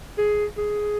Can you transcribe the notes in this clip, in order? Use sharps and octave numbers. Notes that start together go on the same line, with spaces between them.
G#4
G#4